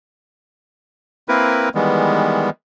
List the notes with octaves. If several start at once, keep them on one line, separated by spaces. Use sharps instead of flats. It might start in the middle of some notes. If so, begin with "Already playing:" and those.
A#3 C4 E4 A#4 B4
D#3 E3 G3 G#3 B3